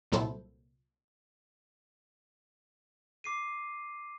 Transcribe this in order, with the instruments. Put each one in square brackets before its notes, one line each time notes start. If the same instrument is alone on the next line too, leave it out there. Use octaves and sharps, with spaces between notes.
[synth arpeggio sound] C2 A#2 F#3 E4 A4 C5
[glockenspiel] D6 C7 D#7